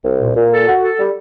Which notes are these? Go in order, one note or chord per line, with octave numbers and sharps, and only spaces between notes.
C2
A#2
A#2
A4
F#4
A4
G3